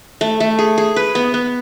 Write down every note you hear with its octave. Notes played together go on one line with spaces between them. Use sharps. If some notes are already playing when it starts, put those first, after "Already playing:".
A3
A3
G#4
G#4
B4
B3
B3